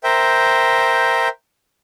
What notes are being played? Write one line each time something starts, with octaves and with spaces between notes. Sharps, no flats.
A#4 C5 E5 G5